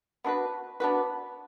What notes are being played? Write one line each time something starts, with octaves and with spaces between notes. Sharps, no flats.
B3 D4 F#4 B4
B3 D4 F#4 B4